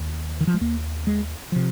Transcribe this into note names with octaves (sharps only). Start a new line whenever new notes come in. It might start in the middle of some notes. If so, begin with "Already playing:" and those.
Already playing: D#2
D#3
F3
G#3
D#2 A#3
G#3
C3 F3